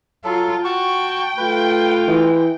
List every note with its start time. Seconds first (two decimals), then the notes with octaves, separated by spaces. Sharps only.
0.24 F#3 F4 A4
0.64 F#4 G5 A5 C#6
1.37 A3 F4 B4
2.08 E3 G#3